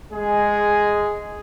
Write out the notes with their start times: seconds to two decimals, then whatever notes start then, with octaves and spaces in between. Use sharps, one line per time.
0.13 G#3 G#4